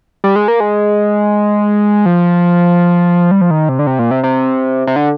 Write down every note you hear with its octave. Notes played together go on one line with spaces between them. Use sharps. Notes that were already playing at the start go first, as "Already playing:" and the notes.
G3
G#3
A#3
G#3
F3
G3
F3
D#3
C3
D3
C3
A#2
C3
C3
C3
D3